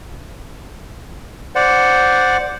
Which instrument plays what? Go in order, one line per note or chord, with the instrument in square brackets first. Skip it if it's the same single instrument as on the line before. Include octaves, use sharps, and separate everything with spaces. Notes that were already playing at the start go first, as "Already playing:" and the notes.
[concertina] C5 D5 F#5